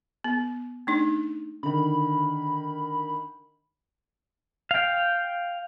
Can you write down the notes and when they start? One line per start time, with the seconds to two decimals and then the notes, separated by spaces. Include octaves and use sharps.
0.24 B3
0.87 A3 D4 D#4
1.63 D3 D#3 B5
4.71 F5 G5